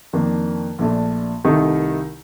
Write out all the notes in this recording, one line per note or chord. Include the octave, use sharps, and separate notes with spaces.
F2 D#3 A#3 D4
A#1 A#2 A3 D4
C2 C3 D#3 A3 D#4